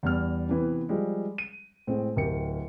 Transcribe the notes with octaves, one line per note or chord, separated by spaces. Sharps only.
E2 G3 F6
C3 E3 B3
F3 G3 G#3
D#7
A2 G#3 C4
D1 G4 A#4 C#7